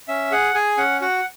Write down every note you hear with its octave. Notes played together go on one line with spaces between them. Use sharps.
C#4 E5
G#4 F#5
G#4 G#5
C#4 F#5
F#4 F#5